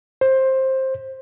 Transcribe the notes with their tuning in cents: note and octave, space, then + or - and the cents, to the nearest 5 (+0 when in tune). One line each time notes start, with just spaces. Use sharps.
C5 +15